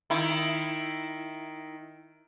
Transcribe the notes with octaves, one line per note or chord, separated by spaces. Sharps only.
D#3 E4